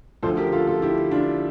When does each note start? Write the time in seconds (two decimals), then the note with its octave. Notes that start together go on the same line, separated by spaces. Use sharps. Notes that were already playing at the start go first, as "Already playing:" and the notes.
0.23 D2 D3 F3 A4 C5
0.37 G4 A#4
0.52 F4 A4
0.67 F4 A4
0.82 E4 G4
1.11 D4 F4